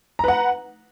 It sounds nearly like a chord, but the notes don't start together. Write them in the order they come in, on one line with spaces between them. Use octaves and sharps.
A#5 B4 F#5